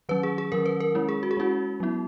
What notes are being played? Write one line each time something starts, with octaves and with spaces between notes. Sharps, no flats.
D#3 F#3 C#4 B4
G#4
G#4
D#3 F#3 C#4 A#4
B4
A#4
G#3 C#4 E4
G#4
F#4
G#4
G#3 C#4 E4 F#4
F#3 B3 E4